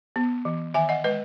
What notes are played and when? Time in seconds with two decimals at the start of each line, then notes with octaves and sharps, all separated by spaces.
0.16 B3
0.45 E3
0.74 D#3 E5 G#5
0.89 D#5 F#5
1.04 G#3 B4 D#5